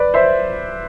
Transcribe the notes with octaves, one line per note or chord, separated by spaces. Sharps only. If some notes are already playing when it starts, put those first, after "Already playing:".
Already playing: B4 D5
C5 E5